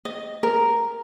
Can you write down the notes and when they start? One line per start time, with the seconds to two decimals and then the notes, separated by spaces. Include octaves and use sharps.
0.05 D#5
0.43 A#4